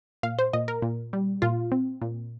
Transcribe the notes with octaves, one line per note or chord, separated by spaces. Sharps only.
A#2 F5
C5
A#2 D#5
A#4
A#2
G3
A#2 F4
C4
A#2